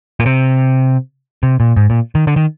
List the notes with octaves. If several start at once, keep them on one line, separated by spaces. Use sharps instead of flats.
A#2
C3
C3
A#2
G#2
A#2
D#3
D3
D#3